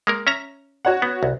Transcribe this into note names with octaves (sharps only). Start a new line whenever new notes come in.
G#3 A#3 A#4
C#4 E5 A#5
F#4 C#5 F#5
B3
C2